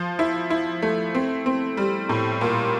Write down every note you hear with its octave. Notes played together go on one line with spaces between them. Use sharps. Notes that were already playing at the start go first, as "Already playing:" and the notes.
Already playing: F3
E4
E4
A3
C4
C4
G3
A2
A#2